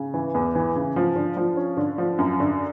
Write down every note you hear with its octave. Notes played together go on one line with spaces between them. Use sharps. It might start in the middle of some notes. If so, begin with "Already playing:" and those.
Already playing: C#3
E3
E2
E3
C#3
F3
D3
F3
C#4
D3
F3
F#2
D3